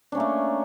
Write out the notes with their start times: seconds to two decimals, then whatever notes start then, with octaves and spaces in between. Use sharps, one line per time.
0.12 D4
0.15 C#4
0.17 A#3
0.20 A3